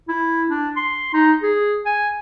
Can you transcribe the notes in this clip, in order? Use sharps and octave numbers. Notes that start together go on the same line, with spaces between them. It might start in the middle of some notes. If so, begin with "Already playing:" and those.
E4
D4
C6
D#4
G#4
G#5